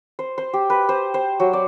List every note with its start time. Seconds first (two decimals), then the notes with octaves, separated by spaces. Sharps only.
0.19 C5
0.38 C5
0.53 G4
0.70 B4
0.89 C5
1.14 C5
1.40 F#3
1.53 D5